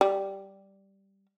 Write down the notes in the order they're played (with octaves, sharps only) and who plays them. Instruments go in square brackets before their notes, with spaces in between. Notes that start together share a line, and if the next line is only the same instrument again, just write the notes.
[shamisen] G3